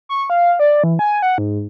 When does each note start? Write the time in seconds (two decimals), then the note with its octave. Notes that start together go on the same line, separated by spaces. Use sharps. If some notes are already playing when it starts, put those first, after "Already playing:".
0.09 C#6
0.30 F5
0.59 D5
0.84 E3
0.99 G#5
1.22 F#5
1.38 G#2